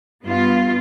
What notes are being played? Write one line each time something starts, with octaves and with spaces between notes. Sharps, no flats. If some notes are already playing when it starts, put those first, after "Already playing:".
G2 B3 F4